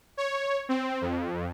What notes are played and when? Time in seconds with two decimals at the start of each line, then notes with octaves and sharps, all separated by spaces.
0.17 C#5
0.69 C4
1.01 F2